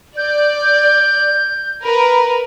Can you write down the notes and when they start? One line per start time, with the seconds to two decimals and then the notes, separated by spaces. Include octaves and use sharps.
0.17 D5 G6
1.83 A#4 B4